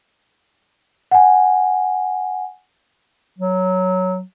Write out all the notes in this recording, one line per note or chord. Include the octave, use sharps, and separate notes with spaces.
F#5 G#5
F#3